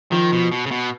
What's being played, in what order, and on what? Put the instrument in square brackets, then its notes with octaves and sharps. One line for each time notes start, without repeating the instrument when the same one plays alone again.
[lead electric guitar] D#3 [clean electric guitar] F3
[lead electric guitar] B2
B2
C#3
B2